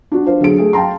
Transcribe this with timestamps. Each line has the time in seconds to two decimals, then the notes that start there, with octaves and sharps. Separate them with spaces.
0.12 D4 F4 F#4
0.25 D4 F4 C5 F5
0.40 D3 F#3 G#4 D7
0.58 A3 G#4
0.73 F5 G5 A5 A#5 C6